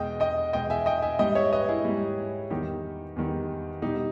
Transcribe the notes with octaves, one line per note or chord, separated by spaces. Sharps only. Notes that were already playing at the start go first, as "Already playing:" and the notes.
Already playing: E2 B2 G#3 D#5 G5
D#5 G5
E2 B2 G#3 D#5 G5
E5 G#5
D#5 G5
E5 G#5
G#2 G3 D#5 G5
C#5 E5
B4 D#5
E4 G#4
G#2 G3
E2 D#3 G3 D#4 G4
E2 D#3 G3
B2 G3 D#4 G4